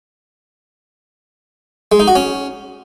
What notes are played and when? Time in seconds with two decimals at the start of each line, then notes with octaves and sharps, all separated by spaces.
1.92 G#3
2.00 D#4
2.08 F#4
2.16 C#4